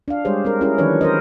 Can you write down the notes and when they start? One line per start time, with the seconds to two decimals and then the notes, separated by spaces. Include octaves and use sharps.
0.08 D4 F5
0.25 G3 G#3 G4 G#4 C5 C#5
0.45 C4 D4 A#4
0.61 C#4 E4 G4 G#4 A#4
0.78 D#3 E3 F#3 D4 B4 C#5
1.01 A#4 C5 D#5